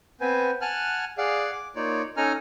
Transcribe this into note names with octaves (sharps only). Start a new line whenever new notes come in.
B3 C4 B4 C5 G#5
F#5 G#5 A5 F6 F#6
G#4 D5 F5 F#5
D6
A#3 D#4 F4 C#5 D5
C#4 D#4 A4 G#5 A#5 F6